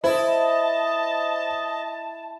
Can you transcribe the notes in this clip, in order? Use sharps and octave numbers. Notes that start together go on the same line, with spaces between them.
E4 C5 D#5 A5